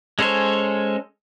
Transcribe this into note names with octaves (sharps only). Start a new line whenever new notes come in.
G#3 C#4 A4 C5 C#5